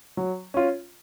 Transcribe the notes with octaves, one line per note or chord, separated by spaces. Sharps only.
F#3
C#4 F4